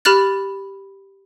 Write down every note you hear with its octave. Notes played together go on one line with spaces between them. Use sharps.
G4 B5 F6 F#6 A6